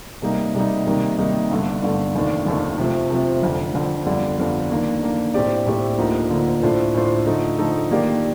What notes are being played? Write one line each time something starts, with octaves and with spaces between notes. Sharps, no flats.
C3 G3 A#3 D#4
C3 G3 A#3 D#4
C3 D#3 G3 A#3 D#4
C3 D#3 G3 A#3 D#4
G1 G2 D3 A3
G1 G2 D3 A3
F1 D#2 D#3 A3 D4
F1 D#2 D#3 A3 D4
C3 F3 A3 C4
C3 F3 A3 C4
F1 F2 D3
F1 F2 D3
G1 F2 D3 G3
G1 F2 D3 G3
D#3 A#3 D4
D#3 A#3 D4
A2 A3 C4 G4 D5
A2 A3 C4 G4 D5
D2 D3 F3 A#3 D#4
D2 D3 F3 A#3 D#4
A2 A3 D4 F4 C5
A2 A3 D4 F4 C5
D3 F3 A3 D#4 A4
D3 F3 A3 D#4 A4
D#3 A#3 D4 G4 D5